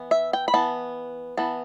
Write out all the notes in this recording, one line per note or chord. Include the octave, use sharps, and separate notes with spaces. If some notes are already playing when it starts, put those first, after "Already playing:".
Already playing: E3 B3
E5
G5
B5
E3 B3 A5
E3 B3 A5